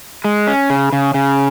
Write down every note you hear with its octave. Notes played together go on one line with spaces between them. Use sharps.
G#3
C#4
C#3
C#3
C#3